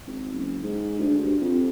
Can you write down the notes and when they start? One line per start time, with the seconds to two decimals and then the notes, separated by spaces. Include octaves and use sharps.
0.07 G#1
0.33 F#1
0.63 G#2
0.99 D2
1.23 G2
1.41 F2